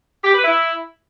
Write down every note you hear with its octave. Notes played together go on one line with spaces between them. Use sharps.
G4
B4
E4